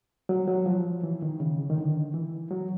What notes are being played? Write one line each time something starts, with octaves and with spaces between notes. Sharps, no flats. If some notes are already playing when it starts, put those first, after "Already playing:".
F#3
F#3
F3
E3
D#3
C#3
D#3
D3
E3
F#3